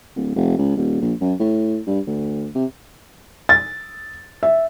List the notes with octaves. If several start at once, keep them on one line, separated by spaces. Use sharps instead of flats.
D1
F1
C#2
D#1
A#1
F#2
A2
G2
D2
C3
A6
E5